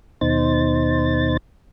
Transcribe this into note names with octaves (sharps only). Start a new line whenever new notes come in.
D#2 B2 D#4 C5 A6